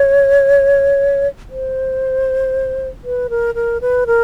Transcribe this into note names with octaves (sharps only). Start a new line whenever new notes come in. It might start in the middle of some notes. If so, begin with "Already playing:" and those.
Already playing: C#5
C5
B4
A#4
A#4
B4
A#4